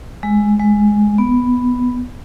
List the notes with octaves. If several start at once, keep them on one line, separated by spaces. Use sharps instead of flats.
G#3
G#3
B3